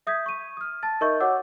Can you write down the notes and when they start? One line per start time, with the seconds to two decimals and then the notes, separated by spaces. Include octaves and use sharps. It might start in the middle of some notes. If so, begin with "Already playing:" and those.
0.07 E5 D#6 G6 G#6 B6
0.26 C#6 D#7
0.57 D#6 F6
0.83 A5 A6
1.01 D#4 A#4 D#5 E5 C#6 G6
1.20 F#4 C#5 F#5 D6 E6